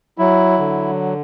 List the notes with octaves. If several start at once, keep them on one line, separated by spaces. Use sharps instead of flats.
F#3 E4
D3